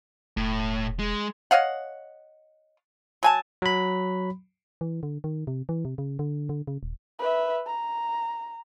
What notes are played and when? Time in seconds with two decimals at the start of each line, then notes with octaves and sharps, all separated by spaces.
0.37 E1 A2
0.99 G#3
1.51 C#5 D#5 F5 F#5
3.23 F#3 G#5 A5
3.62 F#3 B5
4.81 E3
5.03 D3
5.24 D#3
5.47 C3
5.69 E3
5.85 C3
5.98 C#3
6.19 D3
6.49 D3
6.67 C#3
6.83 D#1
7.20 B4 E5
7.67 A#5